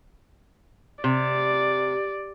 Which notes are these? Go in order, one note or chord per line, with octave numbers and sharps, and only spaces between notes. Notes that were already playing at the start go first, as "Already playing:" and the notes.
C3 D5